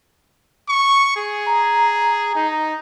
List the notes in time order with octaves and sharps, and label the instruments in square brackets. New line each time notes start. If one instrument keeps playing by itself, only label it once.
[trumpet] C#6
G#4
[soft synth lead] A#5
[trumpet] D#4